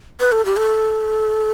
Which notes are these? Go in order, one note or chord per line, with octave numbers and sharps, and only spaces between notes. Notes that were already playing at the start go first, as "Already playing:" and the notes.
B4
A4
G4
A4